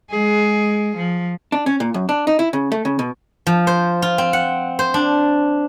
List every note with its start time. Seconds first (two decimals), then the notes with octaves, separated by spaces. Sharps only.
0.10 G#3 G#4
0.96 F3
1.52 D4
1.66 C#4
1.80 A#2
1.94 F#2
2.09 D4
2.27 D#4
2.39 E4
2.53 C#3
2.72 A3
2.85 C#3
2.99 B2
3.47 F3
3.67 C5
4.02 F4
4.18 C4
4.33 F#5
4.79 C5
4.94 D4